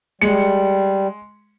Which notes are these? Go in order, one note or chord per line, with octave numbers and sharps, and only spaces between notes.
G3 G#3 C#7